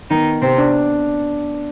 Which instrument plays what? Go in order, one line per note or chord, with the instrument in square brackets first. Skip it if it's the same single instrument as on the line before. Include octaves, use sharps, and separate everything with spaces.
[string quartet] D#3 D#4 [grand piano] B3
[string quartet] C3 C4
[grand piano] D4